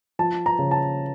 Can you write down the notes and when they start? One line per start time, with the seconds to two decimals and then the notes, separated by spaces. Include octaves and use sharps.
0.19 F3 A5
0.46 A#5
0.59 C#3
0.71 A5